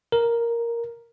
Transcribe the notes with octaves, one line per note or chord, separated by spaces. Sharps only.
A#4